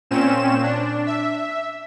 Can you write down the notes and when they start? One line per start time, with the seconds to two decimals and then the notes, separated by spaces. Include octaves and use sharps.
0.11 A#2 C4 C#4 E7
0.63 D4
1.06 E5